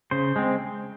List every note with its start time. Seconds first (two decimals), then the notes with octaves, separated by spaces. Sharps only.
0.11 C#3 C5
0.36 G#3 C4